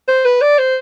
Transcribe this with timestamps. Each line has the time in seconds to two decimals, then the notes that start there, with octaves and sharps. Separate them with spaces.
0.08 C5
0.25 B4
0.42 D5
0.59 C5